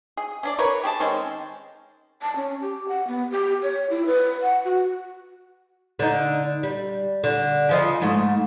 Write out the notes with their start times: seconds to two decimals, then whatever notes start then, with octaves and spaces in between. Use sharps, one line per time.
0.17 G#4
0.43 C#4 D4 D5
0.59 A#4 B4 C#5
0.83 G4 G#4 A5
1.00 D#3 G#3 C4 C#4
2.22 A5
2.36 C#4
2.61 G4
2.88 F#5
3.07 B3
3.31 G4
3.62 C#5
3.90 E4
4.06 B4
4.42 F#5
4.65 F#4
5.99 D3 D#4
6.63 G3
7.24 D3
7.69 C#3 F3 D#5
8.02 G#2 A3